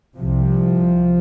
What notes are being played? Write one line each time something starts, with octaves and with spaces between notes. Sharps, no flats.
C2 C3 F3